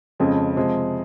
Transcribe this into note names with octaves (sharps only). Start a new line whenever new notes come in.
F2 C#3 F3 G#3 C#4
C3 F3 G#3